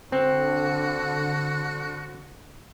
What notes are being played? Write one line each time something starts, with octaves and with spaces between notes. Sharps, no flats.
D3 C4 F#4